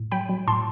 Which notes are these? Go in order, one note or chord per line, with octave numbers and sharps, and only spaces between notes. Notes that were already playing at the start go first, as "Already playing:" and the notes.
Already playing: A2
F#3 G5 B5
F#3
A2 A5 C6